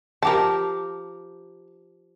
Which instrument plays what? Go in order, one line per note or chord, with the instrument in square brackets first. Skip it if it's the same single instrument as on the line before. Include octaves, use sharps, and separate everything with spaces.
[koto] F3 G4 A#4 [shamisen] A5